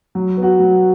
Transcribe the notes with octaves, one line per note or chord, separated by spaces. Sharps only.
F#3
B3
F#4
F#3